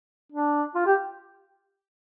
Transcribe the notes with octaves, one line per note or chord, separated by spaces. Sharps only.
D4
F4
G4